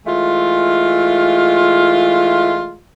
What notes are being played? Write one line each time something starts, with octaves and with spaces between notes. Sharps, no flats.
E3 G#3 A3 F4